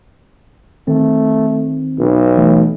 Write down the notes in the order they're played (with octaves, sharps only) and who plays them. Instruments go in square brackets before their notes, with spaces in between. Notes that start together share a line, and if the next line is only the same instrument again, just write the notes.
[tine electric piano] D#3 C4 [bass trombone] A3
[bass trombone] B1
[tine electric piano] E3 A3